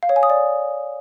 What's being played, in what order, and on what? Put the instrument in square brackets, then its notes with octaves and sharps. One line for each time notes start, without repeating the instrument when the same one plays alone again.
[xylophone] F5
C#5
G#5
D#6
D5